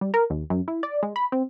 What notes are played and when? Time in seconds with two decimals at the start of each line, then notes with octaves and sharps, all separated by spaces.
0.01 G3
0.14 A#4
0.30 D#2
0.50 F#2
0.68 E4
0.83 D5
1.03 G#3
1.16 B5
1.32 C4